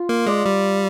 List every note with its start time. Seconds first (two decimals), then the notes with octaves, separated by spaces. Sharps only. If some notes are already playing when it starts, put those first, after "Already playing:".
Already playing: F4
0.09 A#3
0.26 G#3 D5
0.46 G3